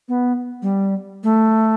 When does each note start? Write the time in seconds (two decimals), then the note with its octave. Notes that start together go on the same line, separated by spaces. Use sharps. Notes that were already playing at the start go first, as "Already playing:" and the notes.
0.09 B3
0.62 G3
1.24 A3